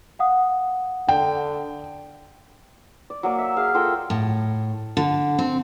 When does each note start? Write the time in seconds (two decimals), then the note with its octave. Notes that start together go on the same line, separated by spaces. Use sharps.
0.19 F5 F#5 D#6
1.09 D3 G5
3.10 D5
3.23 F#3 A#3 D5
3.38 E5
3.57 G#4 F5
3.74 F4 A4 A#4 G5
4.10 A2
4.97 D3
5.38 C4